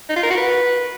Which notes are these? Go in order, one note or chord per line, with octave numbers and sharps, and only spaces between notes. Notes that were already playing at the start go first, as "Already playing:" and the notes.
D#4
F4
A#4
F#4
B4